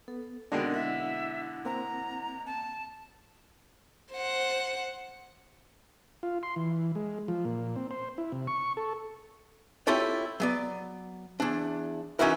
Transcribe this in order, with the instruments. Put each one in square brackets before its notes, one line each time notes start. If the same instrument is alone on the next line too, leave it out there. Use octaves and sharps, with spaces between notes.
[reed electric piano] B3 [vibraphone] A4
[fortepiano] B2 D3 G#3 [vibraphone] C4 D#4 A#4 [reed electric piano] D4 [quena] G5
[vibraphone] E4 F#5 [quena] E5
[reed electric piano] A#3 C4 [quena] A#5
[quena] A5
[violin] C5 F#5
[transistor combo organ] F4
C6
E3
G#3
F3
A#2
C4
C5
E4
C3
C#6
A4
[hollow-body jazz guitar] C4 E4 F4 G4 A4 C#5
F#3 B3 D5
E2 D4
E3 C#4 D#4 E4 F#4 A#4